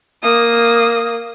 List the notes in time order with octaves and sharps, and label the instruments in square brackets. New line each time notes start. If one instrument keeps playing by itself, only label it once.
[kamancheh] A#3 D#6